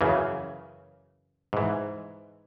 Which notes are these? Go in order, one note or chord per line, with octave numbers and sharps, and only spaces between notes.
F#2 C#3 E3
G#2 E3